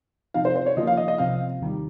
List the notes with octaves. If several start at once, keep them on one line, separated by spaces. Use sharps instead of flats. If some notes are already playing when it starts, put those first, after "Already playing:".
C3 F3 C4 D#4 F5
C5
C5
C#5
D#2 C#3 F3 A#3 F4 D#5
F5
D#5
D#5
C2 C3 F3 C4 F5
D#2 D#3 G3